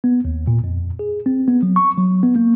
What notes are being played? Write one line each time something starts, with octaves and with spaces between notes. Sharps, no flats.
B3
D#2
A#2
F2
G#4
C4
B3
F#3
C#6
F#3
B3
A#3